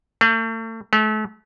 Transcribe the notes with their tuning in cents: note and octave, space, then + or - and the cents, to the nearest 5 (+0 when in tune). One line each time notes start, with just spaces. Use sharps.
A3 +40
A3 -35